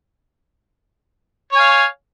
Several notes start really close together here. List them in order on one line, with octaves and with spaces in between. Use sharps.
C#5 G#5 F5